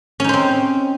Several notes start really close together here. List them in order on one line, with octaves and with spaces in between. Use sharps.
C#4 D#4 C5 C4